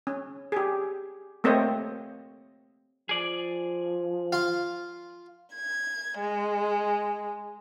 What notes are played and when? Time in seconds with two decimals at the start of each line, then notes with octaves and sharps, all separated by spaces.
0.07 C#4
0.52 G4 G#4
1.44 A3 A#3 C4 C5 C#5 D#5
3.09 F3 G#4 D5
4.33 F4 F5
5.55 G#6
6.18 G#3